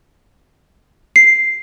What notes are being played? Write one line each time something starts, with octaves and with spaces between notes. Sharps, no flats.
C7